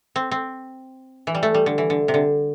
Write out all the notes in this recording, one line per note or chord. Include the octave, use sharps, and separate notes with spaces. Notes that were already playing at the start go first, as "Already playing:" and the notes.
C4
C4
E3
G3
A3
G3
D3
E3
D3
C3
D3